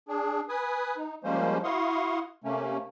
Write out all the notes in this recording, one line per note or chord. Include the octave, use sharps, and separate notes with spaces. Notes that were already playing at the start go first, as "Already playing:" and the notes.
D4 G#4
B4 G#5 D#6
D#4
F3 G3 G#3 A#3 C#4 C5
E4 F#4 F5 C6 C#6 D#6
C3 A3 A#3 C#4